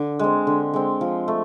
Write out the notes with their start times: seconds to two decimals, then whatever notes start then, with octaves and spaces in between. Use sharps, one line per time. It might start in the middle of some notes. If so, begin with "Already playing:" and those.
Already playing: D3
0.19 G#3 C4
0.47 D3
0.74 G#3 C4
1.01 F3
1.28 A3